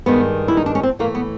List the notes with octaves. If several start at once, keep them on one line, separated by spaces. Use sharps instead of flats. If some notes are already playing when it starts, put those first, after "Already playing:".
G2 D#3 G#3 B3
E4
D#4
D4
C#4
C4
A2 E3 A3 A#3
B3